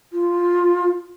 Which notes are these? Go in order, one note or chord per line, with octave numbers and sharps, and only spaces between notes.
F4